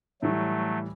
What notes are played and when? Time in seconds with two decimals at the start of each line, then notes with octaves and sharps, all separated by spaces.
0.22 A2 E3 F#3 G3 A3